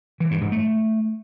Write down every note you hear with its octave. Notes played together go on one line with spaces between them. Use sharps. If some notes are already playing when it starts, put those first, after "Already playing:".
E3
G2
G#2
A3